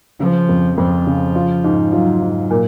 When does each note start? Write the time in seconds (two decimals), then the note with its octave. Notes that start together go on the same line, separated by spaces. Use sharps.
0.20 C#3 F3
0.49 F2
0.77 F2 F3
1.07 C#3
1.35 F4
1.64 G#2
1.93 F#3 F4
2.22 G#2
2.50 A#2